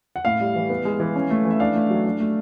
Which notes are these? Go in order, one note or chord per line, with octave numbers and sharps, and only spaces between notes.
F#5
A2 F5
G3
E3
B3
G#3
E3
C#4
A3
E3
E5
D4 F5
A3
F#3
D4
A3